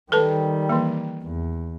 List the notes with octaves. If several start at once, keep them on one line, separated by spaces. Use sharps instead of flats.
D#3 G3 A4 B4 A5
E3 A#3
E2